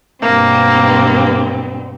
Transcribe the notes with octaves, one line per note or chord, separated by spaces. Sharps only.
G2 B2 A#3 C4